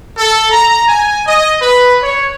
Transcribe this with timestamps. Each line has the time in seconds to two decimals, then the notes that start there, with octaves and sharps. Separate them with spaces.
0.17 A4
0.52 A#5
0.88 G#5
1.27 D#5
1.62 B4
2.02 C#5